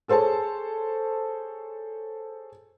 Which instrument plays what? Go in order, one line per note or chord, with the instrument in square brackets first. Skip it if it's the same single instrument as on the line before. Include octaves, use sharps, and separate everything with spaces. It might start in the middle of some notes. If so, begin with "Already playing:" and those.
[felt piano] G#4 A4 C5 C#5 A5